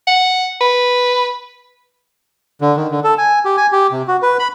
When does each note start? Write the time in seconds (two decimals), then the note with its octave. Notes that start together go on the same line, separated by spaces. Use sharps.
0.08 F#5
0.61 B4
2.61 D3
2.77 D#3
2.91 D3
3.04 A4
3.18 G#5
3.45 G4
3.57 G#5
3.72 G4
3.92 C3
4.08 F#4
4.22 B4
4.39 B5